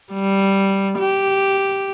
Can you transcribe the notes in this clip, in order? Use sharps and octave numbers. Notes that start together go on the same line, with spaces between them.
G3
G4